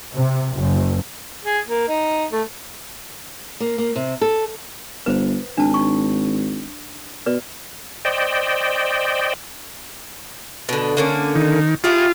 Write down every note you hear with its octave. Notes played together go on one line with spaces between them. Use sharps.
C3
F#1
G#4
A#3
D#4
A3
A#3
A#3
C3
A4
G1 B4 C5
G#1 D4 A5
C#6
B2 B4 D5
C5 D5 D#5 G5
B2 D3
D3 A#3 C#4
D#3
E4 F4 G4 G#4